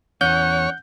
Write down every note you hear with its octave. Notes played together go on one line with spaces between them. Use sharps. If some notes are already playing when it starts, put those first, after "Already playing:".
E2 C#4 C#5 F#5 G6